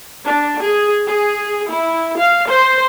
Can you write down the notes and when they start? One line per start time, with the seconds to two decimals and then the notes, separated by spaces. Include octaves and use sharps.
0.25 D4
0.61 G#4
1.08 G#4
1.71 E4
2.19 F5
2.49 C5